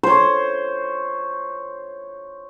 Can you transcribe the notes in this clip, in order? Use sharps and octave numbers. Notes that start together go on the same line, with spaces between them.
C5 C#5